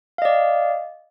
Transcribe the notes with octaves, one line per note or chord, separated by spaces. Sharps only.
D5 D#5 F5